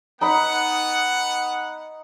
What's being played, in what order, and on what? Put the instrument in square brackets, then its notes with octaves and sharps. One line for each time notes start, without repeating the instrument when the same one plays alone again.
[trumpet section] B3 F#5 [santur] D#4 B5